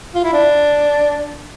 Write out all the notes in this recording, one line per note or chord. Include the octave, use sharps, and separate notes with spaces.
F4
E4
D4